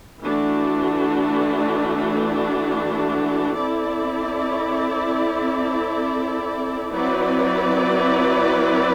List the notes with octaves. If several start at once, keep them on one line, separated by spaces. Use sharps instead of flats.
E3 A3 D4 F#4
C4 E4 A4 D5
F#3 C4 E4 B4 D5